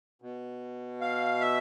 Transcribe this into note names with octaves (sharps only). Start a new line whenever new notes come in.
B2
F5
E5